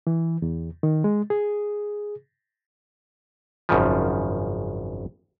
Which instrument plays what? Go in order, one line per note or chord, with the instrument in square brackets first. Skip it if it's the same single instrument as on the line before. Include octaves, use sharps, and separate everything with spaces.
[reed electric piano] E3
E2
D#3
G#3
G#4
[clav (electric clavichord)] G#1 F#2 C#3 F3